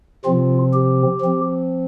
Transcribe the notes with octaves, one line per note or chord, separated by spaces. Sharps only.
C3 F3 C4 F4
G4
F3 C4